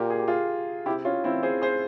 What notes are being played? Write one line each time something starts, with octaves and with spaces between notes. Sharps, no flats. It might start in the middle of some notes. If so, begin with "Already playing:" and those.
Already playing: A#2 G4 A#4
G#4
G4
F4 G#4
C3 E4 G4
C#4 F4
E3 C4 E4
G#4 C5
G#4 C5